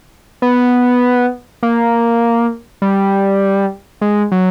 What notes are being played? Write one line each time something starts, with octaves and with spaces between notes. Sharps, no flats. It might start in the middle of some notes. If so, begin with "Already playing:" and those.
B3
A#3
G3
G#3
F#3